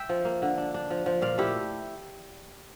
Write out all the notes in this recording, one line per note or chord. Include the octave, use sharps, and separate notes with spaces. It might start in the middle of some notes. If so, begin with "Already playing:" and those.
Already playing: E5 G5
F3
A#3
D3
D4
D4
F3
F3
A#2 D5 F5
A3 E4 G4